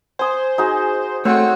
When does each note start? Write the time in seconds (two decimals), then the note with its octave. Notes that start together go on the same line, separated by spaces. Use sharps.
0.19 C5 G#5 D#6
0.58 D#4 F#4 G#4
1.25 A3 C4 F#4 C5 C#5